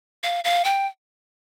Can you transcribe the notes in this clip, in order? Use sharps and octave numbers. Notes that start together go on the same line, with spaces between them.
F5
F5
G5